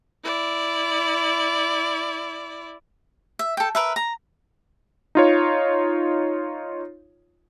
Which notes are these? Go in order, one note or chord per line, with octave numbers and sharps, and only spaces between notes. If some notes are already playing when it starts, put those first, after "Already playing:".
E4 D5
E5
A4 G5
A#4 B4 E5
A#5
D#4 F4 C#5